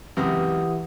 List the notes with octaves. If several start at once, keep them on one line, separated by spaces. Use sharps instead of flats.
C#2 F#2 C3 E3 G4 F#5 D#6